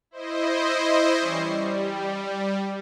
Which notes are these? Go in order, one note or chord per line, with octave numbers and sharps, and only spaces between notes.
E4 C5 D#5
E3 G3 C#4 D5 C#6 C7
G3